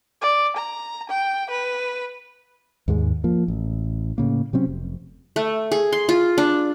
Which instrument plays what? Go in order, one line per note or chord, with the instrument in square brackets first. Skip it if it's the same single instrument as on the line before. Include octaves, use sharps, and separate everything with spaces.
[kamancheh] D5
A#5
G5
B4
[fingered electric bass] D#2 G#2 G#3
F3 A#3
A1
A2 C#3 A#3
C3 F#3 C4 C#4
F1
[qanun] A3
G#4
C6
F4
D4